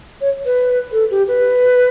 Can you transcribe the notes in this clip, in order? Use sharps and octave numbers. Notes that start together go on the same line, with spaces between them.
C#5
B4
A4
G4
B4